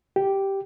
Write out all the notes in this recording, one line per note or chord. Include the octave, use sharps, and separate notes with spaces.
G4